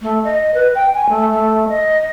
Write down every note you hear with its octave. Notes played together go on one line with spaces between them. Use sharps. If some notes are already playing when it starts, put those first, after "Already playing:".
A3
D#5
B4
G5
G#5
A3
A3
D#5